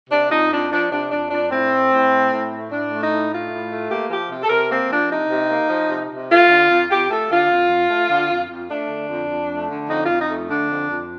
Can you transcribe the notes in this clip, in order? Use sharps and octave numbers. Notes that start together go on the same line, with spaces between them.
C3 D4
F2 D#4
F2 D4
F3 D4
C3 D4
F2 D4
F2 D4
A2 C4
A3
A2
A3
A2
A3
A2 D4
A3
D#4
A2
A3 F4
A2
A3
A#3 G4
F3 G4
C3
A4
C3 A#4
A#3 C4
F3 D4
C3 D#4
C3
A#3
F3
C3
C3
A3 F4
D3
F2
F2 G4
A3 A4
D3 F4
F2
F2
A3
D3
F2
F2
A3 D4
D3
F2
F2
A3
D3
F2 D#4
F2 F4
D#4
A3
D3 D4
F2
F2